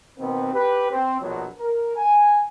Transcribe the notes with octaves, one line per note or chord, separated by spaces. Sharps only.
B2 D#3 B3 C4
G4 B4
C4
A#1 B2 F3 F#3
A#4
G#5